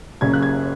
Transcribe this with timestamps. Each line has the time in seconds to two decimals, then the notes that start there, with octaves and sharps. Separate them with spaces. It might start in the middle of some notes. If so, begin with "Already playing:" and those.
0.21 F#1 F#2 C#3 A#3 C#4 G#6
0.34 F#6
0.42 G#6